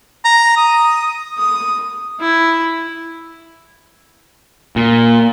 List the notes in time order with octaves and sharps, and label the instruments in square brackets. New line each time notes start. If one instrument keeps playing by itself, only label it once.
[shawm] A#5
D#6
[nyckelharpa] D#6
E4
[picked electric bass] A#2